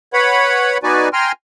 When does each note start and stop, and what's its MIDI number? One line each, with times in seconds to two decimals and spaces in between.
0.13 0.78 71
0.13 0.78 73
0.13 0.78 78
0.13 0.78 83
0.83 1.09 59
0.83 1.09 63
0.83 1.09 66
0.83 1.09 71
0.83 1.09 74
0.83 1.09 80
1.13 1.32 79
1.13 1.32 80
1.13 1.32 82
1.13 1.32 84
1.13 1.32 89